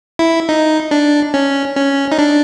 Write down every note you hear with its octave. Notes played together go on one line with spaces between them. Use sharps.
E4
D#4
D4
C#4
C#4
D#4
D4